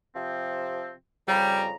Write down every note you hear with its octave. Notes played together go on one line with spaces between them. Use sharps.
C3 F3 C4
F2 C#3 G3 A#5